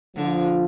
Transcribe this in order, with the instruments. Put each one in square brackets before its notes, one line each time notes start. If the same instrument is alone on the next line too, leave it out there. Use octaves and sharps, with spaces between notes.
[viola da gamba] D3 [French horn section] F3